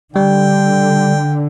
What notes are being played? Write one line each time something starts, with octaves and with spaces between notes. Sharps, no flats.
D3 G3 G5